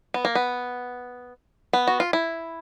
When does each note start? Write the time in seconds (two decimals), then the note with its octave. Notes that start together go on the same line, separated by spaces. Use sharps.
0.14 B3
0.25 A#3
0.35 B3
1.73 B3
1.87 F#4
2.00 F4
2.13 E4